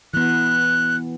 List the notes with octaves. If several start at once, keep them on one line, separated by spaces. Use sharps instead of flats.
E3 B3 F#6